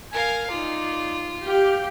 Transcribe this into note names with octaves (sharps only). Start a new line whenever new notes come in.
A#4 F5 G#5
D#4 F4 D5
G4 F5 G5